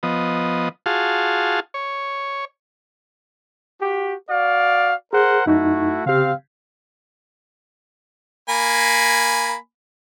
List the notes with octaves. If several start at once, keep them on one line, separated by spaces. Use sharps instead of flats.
F3 B3 D#5
F4 F#4 G#4 F5 A5
C#5
F#4 G4
F#4 D5 F5
G#4 A#4 C5 F#5
F#2 A3 D#4 E4 F#4
C#3 C4 G4 F5
A#3 G#5 B5